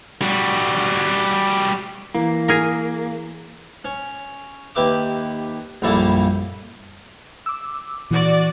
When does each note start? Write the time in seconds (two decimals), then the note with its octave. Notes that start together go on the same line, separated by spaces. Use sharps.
0.22 G3 F#4
2.15 E3 A#3
2.48 G#4 A#4
3.85 C#4
4.75 D#2 G4 B4 E5 D6
5.82 A#1 F#2 G3 A#3 E4 A4
7.46 D6 E6
8.11 A#2 E3 F#4 D5